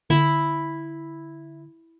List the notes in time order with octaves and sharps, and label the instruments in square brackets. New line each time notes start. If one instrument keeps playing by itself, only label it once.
[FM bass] D3 [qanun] E4